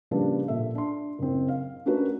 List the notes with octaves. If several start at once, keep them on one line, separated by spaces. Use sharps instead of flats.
C#3 F3 G3 A#3 D4 B4
A#2 A4 E5
D4 C6
F#1 C4
F5
A3 C#4 D4 F#4 A#4 B4